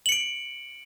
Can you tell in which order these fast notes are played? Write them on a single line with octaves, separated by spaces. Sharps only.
F#7 C#7 D7